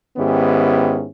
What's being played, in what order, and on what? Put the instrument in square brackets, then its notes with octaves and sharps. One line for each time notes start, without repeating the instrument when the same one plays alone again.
[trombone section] G#2 D#3 B3 C#4 E4 G4